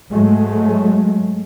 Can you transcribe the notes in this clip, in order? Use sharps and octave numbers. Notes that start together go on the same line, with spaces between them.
G#2 F#3 G#3 A3